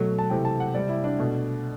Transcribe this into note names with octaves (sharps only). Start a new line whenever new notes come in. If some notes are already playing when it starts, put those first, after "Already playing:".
Already playing: B2 F#3 A3
A5
C3 E3 A3 G5
A5
F#5
C3 G3 D5
E4
D4
B2 A3